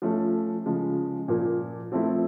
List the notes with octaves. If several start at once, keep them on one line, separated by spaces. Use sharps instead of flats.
F3 A3 C#4
C#3 F3 G#3
A#2 F3 A#3
F3 A3 C4 E4